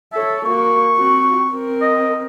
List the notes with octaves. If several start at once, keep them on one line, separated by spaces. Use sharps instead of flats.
A4 C#5 E5
A#3 F#4 C#6
C4 F#4
C4 A#4
D#5